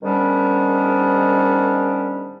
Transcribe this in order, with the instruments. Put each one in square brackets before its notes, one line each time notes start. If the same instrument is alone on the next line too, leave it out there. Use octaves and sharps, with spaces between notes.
[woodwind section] G#2 D#3 G3 B3 C#4 D4